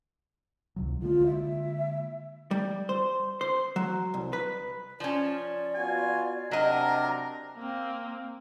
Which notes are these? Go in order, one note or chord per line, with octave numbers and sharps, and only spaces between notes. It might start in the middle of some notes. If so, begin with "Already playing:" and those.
C#2 C3 F#3
D3 G#3 A#3 F4
E5
G3
C5
C5
F#3
C2
B4
F3 C#4 D5
B3 F4 F#4 G#5
C3 F#3 D4 A#4 D#5 A#5
A#3 C4